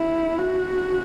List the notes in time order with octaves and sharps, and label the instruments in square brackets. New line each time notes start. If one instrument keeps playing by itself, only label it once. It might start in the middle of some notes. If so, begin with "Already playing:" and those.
Already playing: [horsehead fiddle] E4
F#4